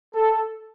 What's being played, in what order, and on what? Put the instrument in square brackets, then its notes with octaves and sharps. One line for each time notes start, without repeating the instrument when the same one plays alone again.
[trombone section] A4